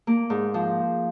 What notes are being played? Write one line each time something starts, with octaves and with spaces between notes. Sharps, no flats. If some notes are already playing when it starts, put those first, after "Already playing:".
A#3
G#2
F3